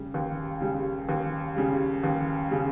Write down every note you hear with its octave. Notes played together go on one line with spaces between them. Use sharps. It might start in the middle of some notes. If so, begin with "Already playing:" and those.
Already playing: C#3 G3
D#2
C#3 G3
D#2
C#3 G3
D#2
C#3 G3